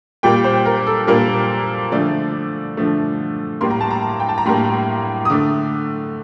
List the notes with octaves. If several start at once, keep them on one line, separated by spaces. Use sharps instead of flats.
A#2 G3 A#3 G5
C5
A#4
A4
A#2 G3 A#3 A#4
D3 F3 A3 D5
D3 F3 A3
A2 G3 A#3 C6
A#5
A5
A#5
G5
A5
A#5
A2 G3 A#3 C6
D#6
D3 A3 D6